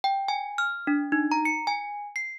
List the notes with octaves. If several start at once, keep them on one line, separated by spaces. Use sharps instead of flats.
G5
G#5
F6
D4
D#4
A#5
C#7
G#5
C7